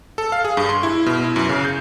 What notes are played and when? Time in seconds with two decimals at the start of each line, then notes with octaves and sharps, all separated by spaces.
0.18 A4
0.32 F5
0.45 G#4
0.57 G2
0.69 C6
0.83 E4
1.06 B2
1.24 E4
1.36 F#2
1.49 C#3
1.65 G6